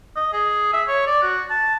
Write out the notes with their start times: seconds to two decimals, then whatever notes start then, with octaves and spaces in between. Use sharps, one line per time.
0.16 D#5
0.33 G#4
0.73 E5
0.88 C#5
1.07 D5
1.22 F#4
1.50 A5